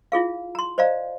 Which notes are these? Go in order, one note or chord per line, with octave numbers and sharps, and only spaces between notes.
E4 F4 G#4 F5
A#5 C6
C5 D5 D#5 F5 A#5